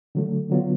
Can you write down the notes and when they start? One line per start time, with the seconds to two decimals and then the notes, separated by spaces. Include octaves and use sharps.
0.15 D3 F#3 A3
0.50 D3 F#3 B3 F4